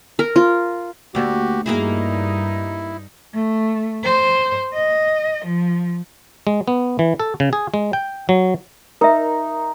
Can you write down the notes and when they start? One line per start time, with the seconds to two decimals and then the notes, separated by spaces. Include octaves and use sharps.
0.19 A#4
0.36 F4
1.15 D2 A#3 F#4 G4
1.66 G2 A#3 D#4 E4 F#4 G#4
3.34 A3
4.04 C5
4.74 D#5
5.45 F3
6.47 G#3
6.68 B3
6.99 E3
7.20 A4
7.40 C#3
7.53 G#4
7.74 G#3
7.93 G5
8.29 F#3
9.01 D#4 A#4 E5